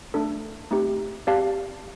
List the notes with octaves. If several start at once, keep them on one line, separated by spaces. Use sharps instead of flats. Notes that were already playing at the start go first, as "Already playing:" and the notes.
A3 D4 A4
A3 C4 D#4 G4
C4 G4 D5 F5 A5